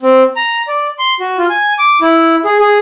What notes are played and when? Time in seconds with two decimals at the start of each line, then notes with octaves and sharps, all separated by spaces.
0.02 C4
0.36 A#5
0.68 D5
0.99 C6
1.20 F#4
1.38 F4
1.50 G#5
1.79 D6
2.01 E4
2.45 G#4
2.60 G#4